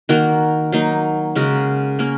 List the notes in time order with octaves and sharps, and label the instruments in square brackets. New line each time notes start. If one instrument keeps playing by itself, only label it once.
[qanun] D#3 A#3 F#4 A#4
F#3 A#3 D#4
C#3 G#3 F#4 A#4
A#3 C#4 A#4